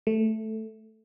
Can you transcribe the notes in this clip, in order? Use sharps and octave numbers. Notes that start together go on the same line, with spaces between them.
A3